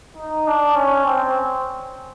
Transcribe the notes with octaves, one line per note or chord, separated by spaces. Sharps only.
D#4
D4
C#4
C4